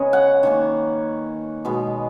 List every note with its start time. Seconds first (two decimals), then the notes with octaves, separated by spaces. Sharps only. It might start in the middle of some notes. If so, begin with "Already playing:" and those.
Already playing: C#3 G#3 B3 C#5 D#5
0.13 F#5
0.43 D#3 A#3 C#4
1.65 B2 G#3 B3